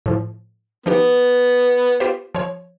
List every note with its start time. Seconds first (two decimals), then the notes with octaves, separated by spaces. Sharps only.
0.06 A2 F3
0.86 F3 B3 D#4 G4
2.00 F4 G4 C5
2.35 F3 C#5